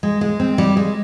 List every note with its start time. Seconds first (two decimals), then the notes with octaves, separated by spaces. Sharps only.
0.03 G#3
0.21 G#3
0.40 C4
0.58 G3
0.77 G#3